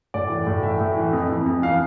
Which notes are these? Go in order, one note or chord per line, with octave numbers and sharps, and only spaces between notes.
A2 D5
E3
A2
E3 E5
A2
E3
F2
E3
F2
E3 F5